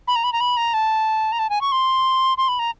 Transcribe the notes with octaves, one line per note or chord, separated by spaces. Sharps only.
B5
A#5
B5
A#5
B5
A#5
A5
A#5
A5
G#5
C#6
C6
C6
B5
A#5